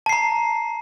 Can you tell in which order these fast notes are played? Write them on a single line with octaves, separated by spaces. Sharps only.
A5 C7 A#5